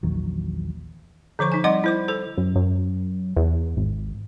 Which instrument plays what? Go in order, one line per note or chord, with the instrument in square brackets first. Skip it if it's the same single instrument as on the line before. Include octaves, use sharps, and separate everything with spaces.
[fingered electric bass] A#1 E2 D#3 F#3
[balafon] D3 F3 C5 C#6
D#4 G#5
G3 C4 D5 F#5 C6 D6
E4 C5 D6
A4 C5
[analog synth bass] F#2
F#2
E2
G#1